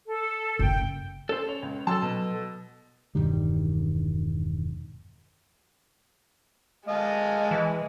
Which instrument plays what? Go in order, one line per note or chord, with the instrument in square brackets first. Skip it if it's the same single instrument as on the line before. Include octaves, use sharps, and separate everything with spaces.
[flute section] A4
[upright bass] F#1 [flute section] G5
[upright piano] C#4 [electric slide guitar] A4 C5
[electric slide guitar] C#5
[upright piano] C#2
[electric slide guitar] F#3 A4 [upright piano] A5 C6 E6
[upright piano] B2
[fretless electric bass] E1 G2 D#3 G3
[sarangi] G#3 [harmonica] D#5 F5 A5
[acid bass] E3